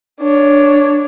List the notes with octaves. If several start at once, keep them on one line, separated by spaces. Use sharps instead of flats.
D4 C#5